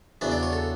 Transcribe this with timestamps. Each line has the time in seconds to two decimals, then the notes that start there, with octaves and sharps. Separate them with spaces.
0.21 E2 C#3 F#3 B3 D4 E5
0.31 D5
0.43 C#5
0.52 A4